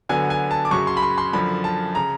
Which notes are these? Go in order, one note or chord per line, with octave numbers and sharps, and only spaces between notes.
D2 D3 F#3 B3 G#5
G#5
A5
D6
F#2 C#3 F#3 C#6
C6
B5
C6
C6
F#2 D3 F3 B5
A5
C#3 A#5